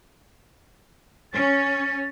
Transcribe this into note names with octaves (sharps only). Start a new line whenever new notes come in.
C#4 A6